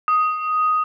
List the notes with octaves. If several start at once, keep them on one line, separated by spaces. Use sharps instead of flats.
D#6